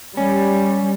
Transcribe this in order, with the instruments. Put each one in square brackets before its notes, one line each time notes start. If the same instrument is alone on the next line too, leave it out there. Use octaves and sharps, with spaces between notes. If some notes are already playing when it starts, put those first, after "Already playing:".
[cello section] G3 [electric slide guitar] C#4